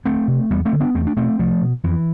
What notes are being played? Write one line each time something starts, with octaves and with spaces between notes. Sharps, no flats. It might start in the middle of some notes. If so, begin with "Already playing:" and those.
D2 A3 C4
C3
E2 G3 B3
A3 C4
D3
B3 D4
E2 A3 C4
D4
B2 A3 C4
C2 F3 A3
B2
F2 E3